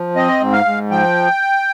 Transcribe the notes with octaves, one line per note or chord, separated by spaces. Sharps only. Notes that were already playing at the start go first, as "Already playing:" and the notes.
Already playing: F3
C4 D#5
G#2
F5
G#2
F3 G5